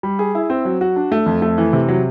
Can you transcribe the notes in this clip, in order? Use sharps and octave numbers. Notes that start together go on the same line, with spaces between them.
G3
G#4
E4
C4
F#3
F#4
D4
A3
F2
A3
E3
C3
F#3